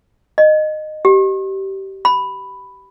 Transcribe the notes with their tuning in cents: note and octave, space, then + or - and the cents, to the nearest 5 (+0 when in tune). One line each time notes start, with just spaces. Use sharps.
D#5 -15
G4 -20
B5 +5